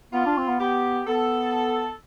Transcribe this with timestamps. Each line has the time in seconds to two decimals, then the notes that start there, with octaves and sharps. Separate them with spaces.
0.13 B3 F4
0.26 D4
0.37 C4
0.48 B3
0.60 B3 G4
1.07 B3 A4